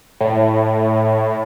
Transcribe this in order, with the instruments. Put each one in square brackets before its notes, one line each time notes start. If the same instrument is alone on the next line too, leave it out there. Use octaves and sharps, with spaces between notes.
[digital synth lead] A2